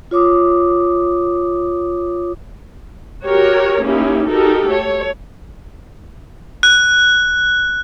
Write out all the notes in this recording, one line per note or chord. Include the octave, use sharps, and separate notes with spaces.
F4 C#5 D6 D#6
F#4 G4 A#4 C#5
A#3 C#4 D#4 E4 G4
D#4 F#4 G4 A4 A#4
A3 C#5
F#6